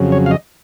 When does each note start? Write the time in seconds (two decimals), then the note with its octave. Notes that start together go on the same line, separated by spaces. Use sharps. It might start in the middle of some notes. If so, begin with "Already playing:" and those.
Already playing: F2 C#3 F#3
0.12 C#5
0.26 F5
0.31 D#5